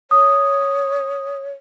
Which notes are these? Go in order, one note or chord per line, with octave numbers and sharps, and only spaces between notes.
C#5 D#6